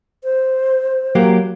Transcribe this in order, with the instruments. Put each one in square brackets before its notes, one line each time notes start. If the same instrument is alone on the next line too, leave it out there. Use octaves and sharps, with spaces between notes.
[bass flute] C5
[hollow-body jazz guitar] F#3 A#3 G4